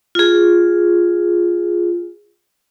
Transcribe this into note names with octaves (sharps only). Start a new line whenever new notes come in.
F4 G#4